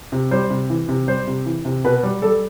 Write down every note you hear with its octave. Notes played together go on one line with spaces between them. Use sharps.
C3
G3 C5
C3
E3
C3
G3 C5
C3
E3
C3
B2 B4
G3
G3 A4